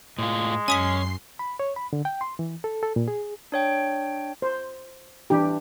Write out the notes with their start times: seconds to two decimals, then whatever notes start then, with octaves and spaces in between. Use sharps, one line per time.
0.19 A2 G#3 F4
0.68 F#2 C#4 G#5 C6 D#6 B6 C7
1.39 B5
1.60 C#5
1.76 B5
1.93 D3
2.05 G5
2.21 C6
2.39 E3
2.64 A4
2.83 A4
2.96 A#2
3.08 G#4
3.52 D4 C#5 G5
4.42 C5
5.30 E3 D4 G4